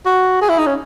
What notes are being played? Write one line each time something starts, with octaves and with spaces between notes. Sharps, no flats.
F#4
G#4
E4
D#4
C#4